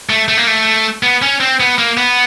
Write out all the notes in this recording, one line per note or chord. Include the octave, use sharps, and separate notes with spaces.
A3
A3
A#3
A3
B3
C#4
C4
B3
A#3
B3